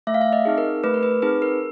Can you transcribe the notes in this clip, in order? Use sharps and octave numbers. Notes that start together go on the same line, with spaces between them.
A3 E5
F5
E5
D#5
C4 D#4 G#4
A#4
A3 B4
A#4
B4
C4 D#4 G#4 B4
A#4